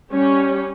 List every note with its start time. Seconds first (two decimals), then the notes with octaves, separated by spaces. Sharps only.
0.11 G3 C#4 G4 C#5